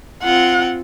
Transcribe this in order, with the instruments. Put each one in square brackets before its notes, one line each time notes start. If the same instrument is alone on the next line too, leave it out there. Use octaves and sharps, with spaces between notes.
[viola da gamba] C4 F4 [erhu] F#5